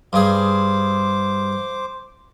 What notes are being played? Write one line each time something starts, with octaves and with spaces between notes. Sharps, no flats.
G2 G#4 C5 D6